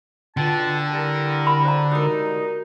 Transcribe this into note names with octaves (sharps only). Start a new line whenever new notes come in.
B2 D3 F4 G5 A5
G3 E4 A#4
B5
C5 A#5
G3 G#3 D#4 F#4 A#4